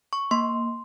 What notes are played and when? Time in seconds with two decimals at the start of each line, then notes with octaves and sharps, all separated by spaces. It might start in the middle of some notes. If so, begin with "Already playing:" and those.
0.13 C#6
0.31 A#3 C6